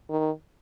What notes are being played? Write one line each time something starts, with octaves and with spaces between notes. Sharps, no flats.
D#3